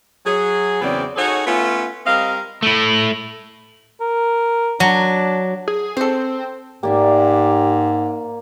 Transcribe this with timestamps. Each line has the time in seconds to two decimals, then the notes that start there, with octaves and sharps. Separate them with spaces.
0.25 F#3 G#4
0.82 E2 C#3 F#3 B3 C4 D5
1.16 D#4 F#4 G#4 A4 C#5
1.45 A3 B3 C#4 F4
2.05 G3 C4 A#4 D#5 F5
2.63 A3 E4
4.01 A#4
4.80 F#3 D4
5.68 G#4
5.97 C4 A4 C5
6.83 G#2 A#3 G4 D5 E5